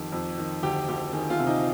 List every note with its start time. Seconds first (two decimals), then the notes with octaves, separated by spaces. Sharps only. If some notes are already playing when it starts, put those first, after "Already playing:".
Already playing: F2 D#3 G4
0.12 F2
0.38 D#3
0.63 D2 G4
0.88 D2 G4
1.13 D#3 G#4
1.30 F4
1.39 C3
1.47 D#4